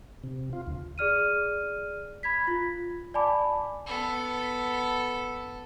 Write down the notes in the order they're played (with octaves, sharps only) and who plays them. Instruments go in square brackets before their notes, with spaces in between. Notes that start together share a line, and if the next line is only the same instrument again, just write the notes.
[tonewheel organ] C3
F4
D2
[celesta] G#4 D5 F6 D#7
B5 G#6 B6
F4
D5 G#5 A5 B5 D6
[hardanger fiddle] B3 A4